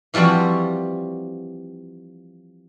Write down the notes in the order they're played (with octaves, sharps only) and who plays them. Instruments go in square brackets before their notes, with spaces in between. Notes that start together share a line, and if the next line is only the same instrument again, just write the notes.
[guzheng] E3 F3 G3 C4 F#4